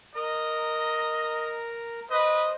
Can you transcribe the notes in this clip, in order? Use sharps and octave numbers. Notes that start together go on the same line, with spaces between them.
A#4 D#5 A#5
B4 C5 D#5